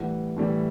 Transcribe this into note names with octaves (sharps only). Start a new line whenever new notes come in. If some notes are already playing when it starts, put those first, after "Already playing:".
Already playing: A2 E3 G3 F#5
A2 E3 G3